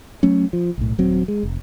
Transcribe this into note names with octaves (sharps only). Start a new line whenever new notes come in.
F#3 A3 C#4
F3
B1 A2
D#1 F#3 C4
G#3
F1